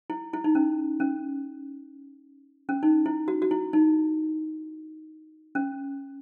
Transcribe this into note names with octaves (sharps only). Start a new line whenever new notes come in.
E4
E4
D#4
C#4
C#4
C#4
D#4
E4
F#4
F#4
E4
D#4
C#4